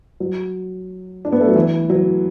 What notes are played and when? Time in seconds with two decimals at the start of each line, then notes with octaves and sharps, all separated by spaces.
0.20 F#3
1.25 D4
1.32 B3
1.41 A3
1.48 F#3
1.56 E3
1.90 F#3